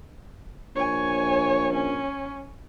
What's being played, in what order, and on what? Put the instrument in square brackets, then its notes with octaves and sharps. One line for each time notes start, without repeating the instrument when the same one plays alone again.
[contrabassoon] A#1 [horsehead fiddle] C#5 G#5
[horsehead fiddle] C#4